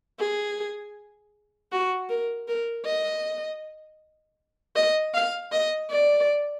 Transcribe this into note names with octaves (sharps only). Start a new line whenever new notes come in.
G#4
F#4
A#4
A#4
D#5
D#5
F5
D#5
D5